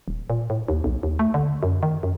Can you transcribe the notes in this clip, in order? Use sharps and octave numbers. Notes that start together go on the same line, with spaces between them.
D#1
A#2
A2
D#2
B1
D#2
A3
D3
F#2
D#3
F#2